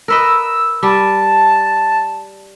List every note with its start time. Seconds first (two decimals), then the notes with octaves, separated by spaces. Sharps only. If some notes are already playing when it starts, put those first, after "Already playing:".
0.08 A#4 B4 D#5 E6
0.83 G3 A5